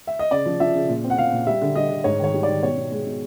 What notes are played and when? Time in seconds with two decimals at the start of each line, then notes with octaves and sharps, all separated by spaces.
0.07 E5
0.19 D#5
0.31 C#3 D5
0.46 F3
0.60 F3 E5
0.75 C#3
0.89 A#2
1.04 C4
1.10 F#5
1.18 A#2 F5
1.32 A#2
1.47 G3 E5
1.61 D3
1.76 G3 D#5
1.90 D3
2.04 G#2 C#5
2.19 D#3 C#5
2.34 G3
2.43 D#3 D5
2.63 B2 C#5
2.77 B2
2.92 G#3
3.06 B2